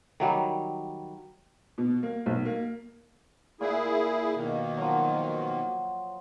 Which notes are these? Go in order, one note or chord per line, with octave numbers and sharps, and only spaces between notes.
D#3 F#3 G3
B2
A#3
B1
A#3
A#2 E4 G#4
B2 D#3 A#3
F3 F#3